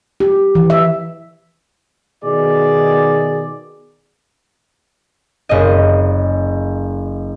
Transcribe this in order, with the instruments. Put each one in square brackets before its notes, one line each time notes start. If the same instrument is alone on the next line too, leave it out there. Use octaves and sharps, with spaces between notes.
[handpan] G4
E3
E5
[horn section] B2 D#3 G#4 D5
[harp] F#1 D#5